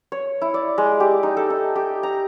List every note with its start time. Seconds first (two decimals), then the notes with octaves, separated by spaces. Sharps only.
0.12 C#5
0.42 E4
0.54 D5
0.78 G#3
1.00 G4
1.23 D#4
1.37 A4
1.50 D#4
1.75 G4
2.03 A#5